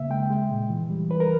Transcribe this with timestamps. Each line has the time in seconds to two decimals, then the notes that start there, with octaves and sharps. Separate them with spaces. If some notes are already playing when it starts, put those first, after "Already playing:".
Already playing: C#3 A#3 E5
0.10 G#3 G5
0.30 G#3
0.51 A#2
0.70 E3
0.90 G3
1.10 E3 B4
1.20 A#4